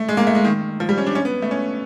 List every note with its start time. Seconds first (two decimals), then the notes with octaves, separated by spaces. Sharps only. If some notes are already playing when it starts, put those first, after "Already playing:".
Already playing: A3
0.09 G#3
0.17 A#3
0.27 A3
0.35 G#3
0.45 D#3
0.80 F3
0.89 G3
0.98 C#4
1.06 D4
1.15 C#4
1.25 B3
1.42 A3
1.51 C#4